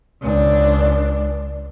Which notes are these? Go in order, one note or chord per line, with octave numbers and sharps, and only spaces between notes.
C#2 D4